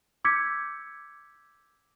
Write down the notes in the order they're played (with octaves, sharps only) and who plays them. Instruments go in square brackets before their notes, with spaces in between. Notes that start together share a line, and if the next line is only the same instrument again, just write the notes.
[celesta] D6 E6 G6 G#6 B6 C#7